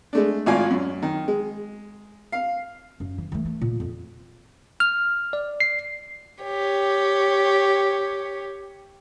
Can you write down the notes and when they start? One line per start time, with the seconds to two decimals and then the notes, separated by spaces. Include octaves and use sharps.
0.13 G#3 A3 D4
0.46 G#1 A2 F4 D5 G#5 F6
0.71 F#2
1.02 D#3
1.28 G#3
2.32 F5
3.00 F#2
3.18 E3
3.32 E3 A3
3.45 A3
3.61 A#2
3.80 F2
4.80 F6
5.33 D5
5.60 C7
6.43 G4 C#5